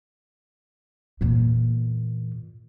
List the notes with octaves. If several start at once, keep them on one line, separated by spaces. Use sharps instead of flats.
E2 A#2